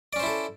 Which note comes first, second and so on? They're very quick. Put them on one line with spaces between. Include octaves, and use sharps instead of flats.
D5 C#4 C5 E4 A4